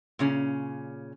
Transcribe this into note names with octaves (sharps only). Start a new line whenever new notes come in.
A#2 C#3 C#4